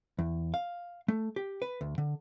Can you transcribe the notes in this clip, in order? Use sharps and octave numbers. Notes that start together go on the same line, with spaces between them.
E2
F5
A3
G4
B4
D2
D3